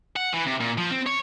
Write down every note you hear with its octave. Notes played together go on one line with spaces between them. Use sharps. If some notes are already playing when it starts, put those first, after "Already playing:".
F#5
E3
C3
A#2
F3
C4
C#5